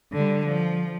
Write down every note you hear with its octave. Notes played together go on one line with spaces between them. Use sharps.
D3 G3
F3